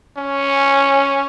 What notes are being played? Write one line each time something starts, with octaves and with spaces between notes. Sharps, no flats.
C#4